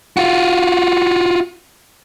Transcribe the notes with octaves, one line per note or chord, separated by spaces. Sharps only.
F4 F#4